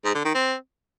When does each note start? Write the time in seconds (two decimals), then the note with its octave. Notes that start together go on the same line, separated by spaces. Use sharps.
0.05 G#2
0.15 D3
0.25 D#3
0.35 C4